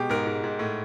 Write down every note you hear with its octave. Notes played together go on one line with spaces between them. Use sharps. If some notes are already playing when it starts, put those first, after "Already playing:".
Already playing: B2 G#3 G4
G#2 A#4
G#2
G#2
A2